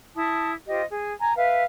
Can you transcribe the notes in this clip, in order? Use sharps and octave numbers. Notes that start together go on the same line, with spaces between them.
E4 A5 D#6
F4 G4 C5 D#5
G#4
G#5 A#5
B4 E5 F5